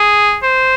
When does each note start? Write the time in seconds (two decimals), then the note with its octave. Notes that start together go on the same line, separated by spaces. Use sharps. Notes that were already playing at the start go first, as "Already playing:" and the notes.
Already playing: G#4
0.43 C5